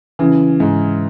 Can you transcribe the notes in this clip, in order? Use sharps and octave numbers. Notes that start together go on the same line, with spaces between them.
C#3 E3
G#2